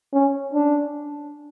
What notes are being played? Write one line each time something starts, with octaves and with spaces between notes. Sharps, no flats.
C#4
D4